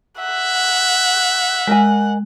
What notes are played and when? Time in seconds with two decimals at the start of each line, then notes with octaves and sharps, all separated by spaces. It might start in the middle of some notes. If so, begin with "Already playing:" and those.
0.19 E5 F#5
1.67 G#3 A#4 D#5 G#5